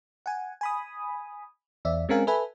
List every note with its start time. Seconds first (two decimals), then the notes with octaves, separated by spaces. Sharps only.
0.26 F#5 G#5
0.61 G#5 B5 D#6
1.85 E2 D5 E5
2.09 G#3 C4 C#4 A#4 F5 G#5
2.27 A4 B4 E5 G#5 B5